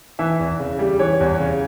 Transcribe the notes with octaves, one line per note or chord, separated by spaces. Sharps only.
E3 E5
E2
C#3
G3
E3 C#5
E2
C#3